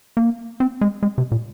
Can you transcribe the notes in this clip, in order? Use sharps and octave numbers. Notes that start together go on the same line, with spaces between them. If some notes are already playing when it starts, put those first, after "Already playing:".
A#3
C4
G#3
G#3
C3
A#2